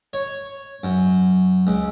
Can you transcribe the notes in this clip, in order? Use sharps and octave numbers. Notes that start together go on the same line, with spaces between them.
C#5
F#2
C#2